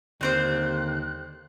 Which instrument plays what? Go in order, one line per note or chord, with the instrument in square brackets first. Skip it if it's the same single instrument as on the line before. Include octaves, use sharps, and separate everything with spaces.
[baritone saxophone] D#2 [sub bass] D3 [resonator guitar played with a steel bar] G3 C4 C5 [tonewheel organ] F#6